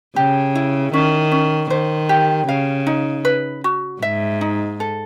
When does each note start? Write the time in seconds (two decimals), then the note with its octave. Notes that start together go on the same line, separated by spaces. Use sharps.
0.16 C#3 G4
0.55 E4
0.93 D#3 C#4
1.32 C#4
1.70 D#3 C5
2.09 G4
2.48 C#3 F5
2.87 D#4
3.25 B4
3.64 F#4
4.02 G#2 E5
4.41 D#4
4.80 A4